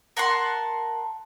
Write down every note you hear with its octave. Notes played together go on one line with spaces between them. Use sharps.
A#4 F#5 A5 C6